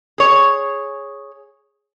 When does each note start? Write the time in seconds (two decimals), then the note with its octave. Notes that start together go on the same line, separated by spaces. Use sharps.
0.18 G#4 C#5